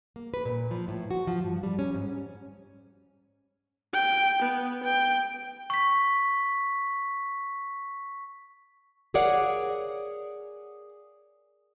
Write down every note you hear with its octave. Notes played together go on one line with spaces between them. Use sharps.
A#3
B4
A#2
F3
A2
F#4
F3
G2
G3
C#4
G#2
G5
B3
G5
C#6 B6
G#4 A#4 C#5 D5 F5 F#5